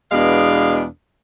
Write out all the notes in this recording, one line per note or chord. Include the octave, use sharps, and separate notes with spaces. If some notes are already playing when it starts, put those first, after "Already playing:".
E2 B2 G#3 B3 D4 F5